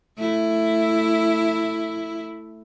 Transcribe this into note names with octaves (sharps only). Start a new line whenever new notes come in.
A3 E4